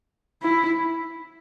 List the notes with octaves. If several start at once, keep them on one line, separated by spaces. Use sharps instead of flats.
E4